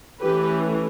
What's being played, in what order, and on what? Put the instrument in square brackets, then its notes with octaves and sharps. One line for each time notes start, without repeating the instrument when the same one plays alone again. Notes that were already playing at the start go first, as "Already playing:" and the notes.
[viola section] E3 A3 C#4 G4 B4